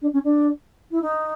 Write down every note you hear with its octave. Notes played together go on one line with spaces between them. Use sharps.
D4
C#4
D4
E4
D#4